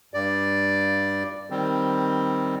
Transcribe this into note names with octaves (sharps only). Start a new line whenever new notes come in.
G2 D5
D#3 G3 C4